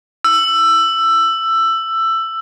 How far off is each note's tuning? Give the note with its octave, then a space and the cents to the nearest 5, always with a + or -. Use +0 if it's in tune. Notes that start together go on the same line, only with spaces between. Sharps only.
E6 +15